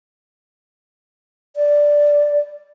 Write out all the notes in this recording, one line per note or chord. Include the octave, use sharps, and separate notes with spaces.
D5